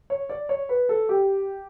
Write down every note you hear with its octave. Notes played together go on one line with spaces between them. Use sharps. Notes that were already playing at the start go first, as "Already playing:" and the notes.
C#5
D5
C#5
B4
A4
G4